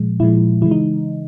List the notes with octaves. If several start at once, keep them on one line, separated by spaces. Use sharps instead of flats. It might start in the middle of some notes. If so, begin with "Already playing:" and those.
Already playing: A#2 F3 G#3
A#2 F3 G#3 E4
C#3 E3 G#3 E4
D#4